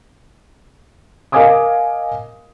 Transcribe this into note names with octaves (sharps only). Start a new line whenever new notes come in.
A#4 D#5 F5 G#5 D6 D#6